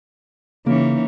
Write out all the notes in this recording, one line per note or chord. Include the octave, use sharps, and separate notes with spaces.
C#3 E3 A#3 C#4 D#4